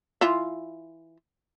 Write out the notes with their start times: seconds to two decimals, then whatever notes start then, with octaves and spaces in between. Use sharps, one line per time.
0.21 E3 F4 E5